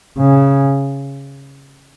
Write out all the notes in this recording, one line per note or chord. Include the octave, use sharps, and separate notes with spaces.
C#3